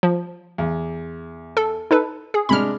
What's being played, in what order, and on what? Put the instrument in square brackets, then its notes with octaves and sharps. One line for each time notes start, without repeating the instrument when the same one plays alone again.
[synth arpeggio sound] F3
[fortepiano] E2
[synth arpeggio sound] A4
D#4 A4 B4
G#4
[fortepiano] C3 G#3 D4 [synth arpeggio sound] B5 F6